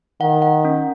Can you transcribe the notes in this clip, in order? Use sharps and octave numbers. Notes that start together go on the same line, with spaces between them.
D#3 F#5
F#5
C#4